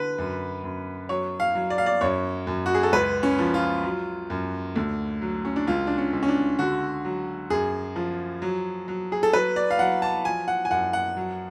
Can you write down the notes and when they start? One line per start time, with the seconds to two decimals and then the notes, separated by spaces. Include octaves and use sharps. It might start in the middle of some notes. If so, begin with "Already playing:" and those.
Already playing: D3 B4
0.18 F#2
0.64 F#2
1.09 F#3 C#5
1.40 F5
1.55 F#3
1.70 D5
1.78 F5
1.86 D5
2.01 F#2 C#5
2.47 F#2
2.66 F#4
2.74 G#4
2.83 A4
2.92 C#2 B4
3.23 C#4
3.39 F3
3.54 F4
3.84 F#3
4.30 F#2
4.76 D2
5.22 F#3
5.45 C#4
5.56 D4
5.67 C#2 F4
5.87 D4
5.98 C#4
6.13 C#2
6.23 C#4
6.28 D4
6.59 D3 F#4
7.05 F#3
7.50 F#2 G#4
7.96 F3
8.42 F#3
8.88 F#3
9.12 G#4
9.23 A4
9.33 F#3 B4
9.56 D5
9.71 F5
9.79 F#3 F#5
10.02 A5
10.25 F3 G#5
10.48 F#5
10.65 G#5
10.71 F#2 F#5
10.93 F#5
11.17 F#3